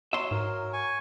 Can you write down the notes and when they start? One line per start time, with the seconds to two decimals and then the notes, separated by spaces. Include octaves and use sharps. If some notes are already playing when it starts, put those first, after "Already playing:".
0.13 F#3 E5 C6
0.31 G#2 A#4
0.73 G#5 C#6